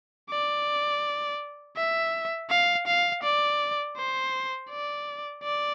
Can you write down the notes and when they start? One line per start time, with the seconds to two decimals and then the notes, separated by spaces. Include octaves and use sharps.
0.30 D5
1.77 E5
2.50 F5
2.87 F5
3.23 D5
3.97 C5
4.70 D5
5.43 D5